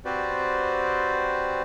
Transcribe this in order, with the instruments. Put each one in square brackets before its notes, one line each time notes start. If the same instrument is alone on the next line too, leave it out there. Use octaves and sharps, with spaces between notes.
[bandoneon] C4 F#4 G4 B4 C5 D5